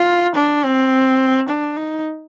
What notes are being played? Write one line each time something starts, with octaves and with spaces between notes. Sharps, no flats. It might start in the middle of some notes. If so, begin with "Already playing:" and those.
Already playing: F4
D4
C4
D4
D#4